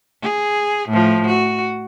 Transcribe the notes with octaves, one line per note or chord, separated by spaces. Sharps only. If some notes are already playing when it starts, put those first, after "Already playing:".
G#4
A2 F3
F#4